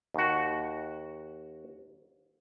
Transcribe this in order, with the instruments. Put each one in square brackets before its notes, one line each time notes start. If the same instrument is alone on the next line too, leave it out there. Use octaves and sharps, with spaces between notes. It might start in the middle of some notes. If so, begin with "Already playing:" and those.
[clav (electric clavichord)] D#2 F#4